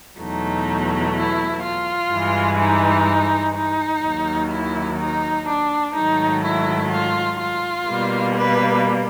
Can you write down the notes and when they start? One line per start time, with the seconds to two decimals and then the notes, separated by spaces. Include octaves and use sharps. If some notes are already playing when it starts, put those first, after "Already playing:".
0.19 E2 B2 F#3 A3 D#4
1.15 E4
1.64 F4
2.12 G2 E3 G#3
2.60 D#4
3.55 D#4
4.04 D#2 D#3 F#3
4.51 E4
5.00 D#4
5.48 D4
5.96 G#2 D#3 F#3 A3 D#4
6.44 E4
6.92 F4
7.40 F4
7.88 B2 G3 A#3
8.36 B4